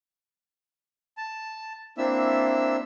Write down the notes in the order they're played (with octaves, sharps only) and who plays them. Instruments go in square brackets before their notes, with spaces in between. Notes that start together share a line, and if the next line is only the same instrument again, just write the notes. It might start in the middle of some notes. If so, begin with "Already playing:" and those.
[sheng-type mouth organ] A5
A#3 C4 D4 E4 E5 E6